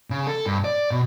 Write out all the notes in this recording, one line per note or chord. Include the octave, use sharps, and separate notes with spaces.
C#3
A4
G2
D5
B2